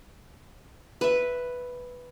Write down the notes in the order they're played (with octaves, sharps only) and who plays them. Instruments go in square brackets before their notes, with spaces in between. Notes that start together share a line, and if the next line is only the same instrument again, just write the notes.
[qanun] B4 E5